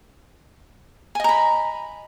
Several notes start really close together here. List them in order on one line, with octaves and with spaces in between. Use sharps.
G#5 D#5 A#5 B5